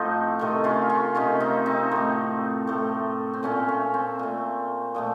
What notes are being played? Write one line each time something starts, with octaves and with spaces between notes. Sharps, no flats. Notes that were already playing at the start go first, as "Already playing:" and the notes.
Already playing: A2 F3 A3 C4 D#4 F4
C3 D#3 A3
C#4 F4
C#4 F4
C3 D#3 A3 C#4 F4
C4 D#4
C4 D#4
A2 A3
A2 A3
C4
A#2 A3 C#4
C#4
C4
A#2 A3
A#2 F3 A3